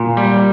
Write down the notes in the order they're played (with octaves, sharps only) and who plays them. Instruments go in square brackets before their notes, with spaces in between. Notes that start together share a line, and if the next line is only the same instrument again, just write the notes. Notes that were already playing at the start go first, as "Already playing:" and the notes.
Already playing: [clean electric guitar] A#2
G3